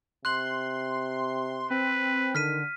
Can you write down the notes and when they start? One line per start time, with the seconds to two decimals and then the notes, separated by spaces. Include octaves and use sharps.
0.25 C3 C6 F#6 F#7
1.70 C4 B4
2.35 D3 D#3 F6 B6 D#7